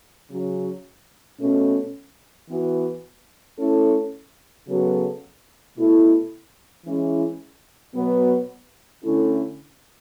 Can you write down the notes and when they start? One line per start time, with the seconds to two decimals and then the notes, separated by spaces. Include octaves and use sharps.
0.30 C#3 F#3 C#4
1.40 B2 A3 C#4
2.49 E3 B3 F#4 B4
3.58 A3 C#4 E4 A4
4.68 C#3 F#3 B3 F#4 A4
5.76 B2 A3 E4 A4
6.85 E3 G#3 C#4 E4
7.95 B2 F#3 B3
9.04 D3 A3 C#4 E4